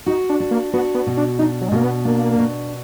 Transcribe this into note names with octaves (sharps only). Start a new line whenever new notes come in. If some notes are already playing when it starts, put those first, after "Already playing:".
D#4 F#4
D4
D4
A#3
B3 F#4
B3
B2
D4
D4 D#4
F#3
G#3
B2 A#3
B3
A#3 D4
B2